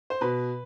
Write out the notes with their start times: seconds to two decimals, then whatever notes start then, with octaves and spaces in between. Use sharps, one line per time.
0.10 C5
0.21 B2 B4